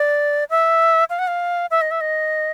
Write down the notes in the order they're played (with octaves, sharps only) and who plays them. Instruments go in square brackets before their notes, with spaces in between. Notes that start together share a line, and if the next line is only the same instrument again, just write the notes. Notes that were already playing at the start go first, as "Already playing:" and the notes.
Already playing: [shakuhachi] D5
E5
F5
F#5
F5
E5
D#5
E5
D#5